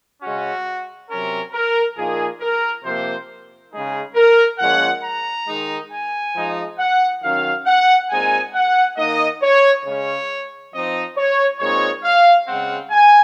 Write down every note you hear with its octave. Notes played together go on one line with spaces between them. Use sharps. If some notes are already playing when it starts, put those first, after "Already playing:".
C#3 G#3 C#4 F#4
C3 F#3 C#4 A#4
A#4
A#2 F3 A#3 D#4 G#4
A#4
C3 F3 A#3 C5
C#3 G#3 D#4 G#4
A#4
A#2 F3 G#3 C#4 F#5
A#5
D#3 G#3 D#4
G#5
F3 G#3 D#4
F#5
D#3 F#3 C#4 F5
F#5
A#2 G#3 C4 D#4 G#5
F#5
D#3 A#3 D#4 D#5
C#5
C#3 G#3 C#4 C#5
F3 C4 D#4 D#5
C#5
A#2 G#3 C4 D#4 C#5
F5
C#3 G#3 C4 F#5
G#5